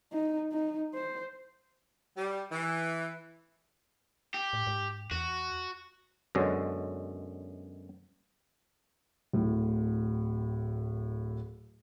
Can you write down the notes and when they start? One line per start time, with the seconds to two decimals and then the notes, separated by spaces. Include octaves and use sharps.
0.12 D#4
0.52 D#4
0.94 C5
2.17 G3
2.52 E3
4.34 G4
4.53 A2
4.67 G#2
5.11 E2 F#4
6.35 F#2 B2 D3 G#3 C#4
9.33 D1 A2